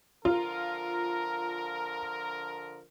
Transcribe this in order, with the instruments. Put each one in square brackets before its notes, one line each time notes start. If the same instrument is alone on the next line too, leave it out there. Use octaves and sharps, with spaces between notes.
[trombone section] D3 F3 A#4 [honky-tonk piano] F4